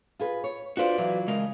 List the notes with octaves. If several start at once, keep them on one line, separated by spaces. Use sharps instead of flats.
F4 G#4 B4
C#5
D4 F4 F#4 B4 C5 D5
E3 F#3 F4
C#3 G#3 A#4